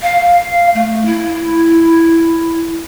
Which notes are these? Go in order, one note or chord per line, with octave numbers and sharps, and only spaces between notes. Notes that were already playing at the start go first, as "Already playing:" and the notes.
F5
A3
E4